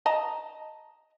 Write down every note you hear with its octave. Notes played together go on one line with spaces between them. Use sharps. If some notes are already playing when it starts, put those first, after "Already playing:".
D#5 A5 A#5